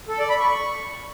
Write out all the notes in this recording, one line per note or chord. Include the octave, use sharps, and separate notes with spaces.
A4
D5
B5
C#6